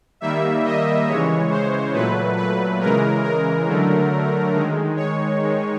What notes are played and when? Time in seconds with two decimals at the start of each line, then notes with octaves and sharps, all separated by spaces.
0.21 D#3 G3 A#3 E5
0.65 D#5
1.08 C#3 E3 G#3 C#5
1.50 C5
1.93 A#2 F#3 A3 B4
2.37 B4
2.80 C#3 E3 G#3 A#4
3.24 A#4
3.67 D3 F#3 A3
4.54 D#3 G#3
4.96 C#5
5.40 D#3 G#3